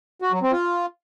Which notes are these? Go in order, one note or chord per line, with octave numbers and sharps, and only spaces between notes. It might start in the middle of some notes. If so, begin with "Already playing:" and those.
F#4
F#3
C4
F4